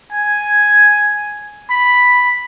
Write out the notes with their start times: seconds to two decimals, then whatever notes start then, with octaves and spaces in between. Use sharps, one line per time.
0.13 G#5
1.70 B5